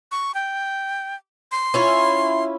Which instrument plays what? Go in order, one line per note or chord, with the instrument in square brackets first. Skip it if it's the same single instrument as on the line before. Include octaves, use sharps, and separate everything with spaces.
[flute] C#6
G5
C6
[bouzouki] C#4 E4 F4